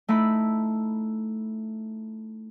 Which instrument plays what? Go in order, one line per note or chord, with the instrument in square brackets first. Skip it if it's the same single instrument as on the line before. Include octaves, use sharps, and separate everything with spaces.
[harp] A3 D#4 E4 B5